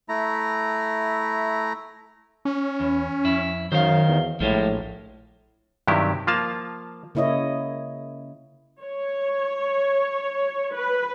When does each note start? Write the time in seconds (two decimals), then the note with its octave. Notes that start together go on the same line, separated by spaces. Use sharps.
0.09 A3 E4 A#5
2.45 C#4
2.80 E2
3.24 F2 E4
3.72 F#2 D#3 C5 F5
4.08 E2
4.40 A#1 A2 F3 G3 G#3
5.87 G2 C3 D#3 F#3 E4 G4
6.27 F3 A#3 F4 F5 A5
7.15 C#3 A#3 E4 C#5 D#5
8.83 C#5
10.76 B4